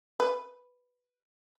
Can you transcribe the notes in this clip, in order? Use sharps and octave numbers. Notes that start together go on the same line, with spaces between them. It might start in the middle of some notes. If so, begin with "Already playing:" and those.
B4